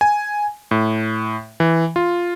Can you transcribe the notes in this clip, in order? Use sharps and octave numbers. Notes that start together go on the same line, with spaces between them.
G#5
A2
E3
F4